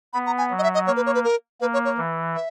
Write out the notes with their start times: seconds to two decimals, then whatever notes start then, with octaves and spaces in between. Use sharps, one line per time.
0.13 B3 B5
0.26 A#5
0.38 G#5
0.50 F#3
0.59 D#5
0.63 E5
0.74 D#5
0.87 A#3 C#5
0.96 B4
1.06 C#5
1.15 B4
1.24 A#4
1.61 A#3 B4
1.73 C#5
1.85 C#5
1.98 E3
2.35 E5